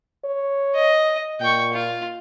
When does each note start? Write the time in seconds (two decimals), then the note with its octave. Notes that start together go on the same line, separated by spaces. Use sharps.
0.24 C#5
0.75 D#5
1.40 A#2 G5 C#6
1.73 F4